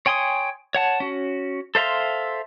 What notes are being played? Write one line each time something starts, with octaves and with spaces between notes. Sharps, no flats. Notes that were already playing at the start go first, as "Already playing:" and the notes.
C#5 G5 G#5 C6 D#6
C#5 F#5 A5
C#4 F#4
A4 C5 E5 F5 C6